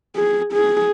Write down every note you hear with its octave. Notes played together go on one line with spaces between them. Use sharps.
G#4
G#4